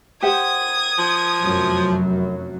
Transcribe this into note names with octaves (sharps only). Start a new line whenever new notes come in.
G4 C5 F#5 D#6 G#6
F3
F1 F#2 F#3